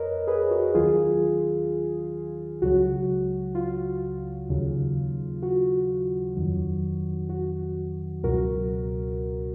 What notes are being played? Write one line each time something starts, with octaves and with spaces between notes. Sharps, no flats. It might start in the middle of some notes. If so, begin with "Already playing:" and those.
Already playing: F2 A#4 B4 C#5 D#5
G#4 B4
F#4 A#4
D#2 D#3 F#3 F4 G#4
C#2 C#3 F#3 F#4
F4
D#2 C#3 F#3
F#4
F2 D#3 F#3
F#4
C#2 B2 F#3 F#4 A#4